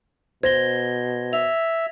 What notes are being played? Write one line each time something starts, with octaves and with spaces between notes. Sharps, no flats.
B2 C5 G#6 A#6 G7
E5 F7